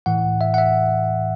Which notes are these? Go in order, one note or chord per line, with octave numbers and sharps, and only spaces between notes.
A2 E3 F#5
E5
F#5
E5